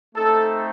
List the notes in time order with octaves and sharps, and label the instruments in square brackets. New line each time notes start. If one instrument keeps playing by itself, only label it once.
[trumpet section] A3 C4 D#4 A4